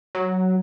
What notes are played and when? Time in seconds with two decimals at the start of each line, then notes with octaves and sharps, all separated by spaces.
0.15 F#3